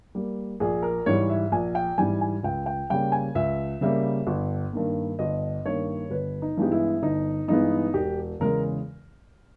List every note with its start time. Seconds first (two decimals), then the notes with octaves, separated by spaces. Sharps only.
0.15 G3 A#3
0.60 A#1 G#4
0.83 A#4
1.06 G#2 E3 G3 C#5
1.30 E5
1.52 A#1 G#5
1.75 G5
1.98 G#2 E3 G3 G#5
2.21 G#5
2.43 C#2 G5
2.66 G5
2.90 C#3 G3 A#3 G5
3.12 G#5
3.35 C#2 E5
3.81 C#3 G3 A#3 E5
4.27 G1
4.73 G2 D#3 A#3
5.19 G1 D#5
5.66 G2 D#3 A#3 C#5
6.10 G1 B4
6.42 D#4
6.57 G2 E3 G#3 B3 G4
6.72 E4
7.02 G1 D#4
7.48 G2 E3 G#3 B3 D#4
7.94 E1 G4
8.40 E2 C#3 G#3 A#4